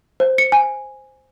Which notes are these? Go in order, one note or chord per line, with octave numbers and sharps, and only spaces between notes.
C5
C#7
G#5